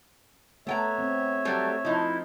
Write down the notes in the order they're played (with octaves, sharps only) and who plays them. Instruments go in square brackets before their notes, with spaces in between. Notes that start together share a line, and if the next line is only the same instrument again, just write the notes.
[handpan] A3 [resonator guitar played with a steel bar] B3 G5 A#5 [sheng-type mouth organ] C#5 E5
[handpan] C4
[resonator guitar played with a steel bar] F#3 G3 A3
[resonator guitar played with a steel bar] F3 D#4 [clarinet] E4 [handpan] D#5